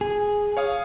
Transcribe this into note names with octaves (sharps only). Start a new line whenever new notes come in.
G#4
C#5 F5 D#6